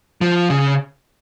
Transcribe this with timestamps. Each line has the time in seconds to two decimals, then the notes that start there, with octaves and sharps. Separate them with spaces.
0.21 F3
0.50 C#3